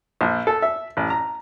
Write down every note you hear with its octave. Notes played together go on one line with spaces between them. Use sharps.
A#1
A4
E5
A1
A#5